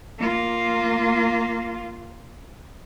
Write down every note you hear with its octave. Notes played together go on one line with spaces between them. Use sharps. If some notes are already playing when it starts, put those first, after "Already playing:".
A#3 F4